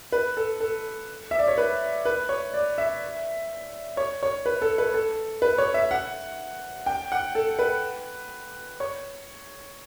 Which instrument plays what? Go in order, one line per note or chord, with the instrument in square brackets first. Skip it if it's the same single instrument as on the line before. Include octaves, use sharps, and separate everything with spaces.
[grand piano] B4
A4
A4
E5
D5
C#5
B4
B4
C#5
D5
E5
C#5
C#5
B4
A4
B4
A4
B4
C#5
E5
F#5
G5
F#5
A4
B4
C#5